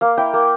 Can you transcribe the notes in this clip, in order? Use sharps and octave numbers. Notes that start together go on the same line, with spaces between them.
A#3 F5
E4 G5
A#3